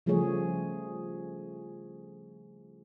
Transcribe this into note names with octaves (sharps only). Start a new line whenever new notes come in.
C#3 F3 G3 A3 G#4 C#5